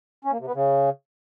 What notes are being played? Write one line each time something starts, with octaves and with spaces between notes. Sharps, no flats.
C#4
A#3
C3
B3
C#3